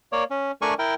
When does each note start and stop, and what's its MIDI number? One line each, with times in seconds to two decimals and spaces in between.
0.12 0.24 58
0.12 0.24 73
0.12 0.24 74
0.30 0.51 61
0.62 0.74 57
0.62 0.74 62
0.62 0.74 70
0.62 0.74 74
0.62 0.74 80
0.62 0.74 85
0.79 0.95 64
0.79 0.95 70
0.79 0.95 79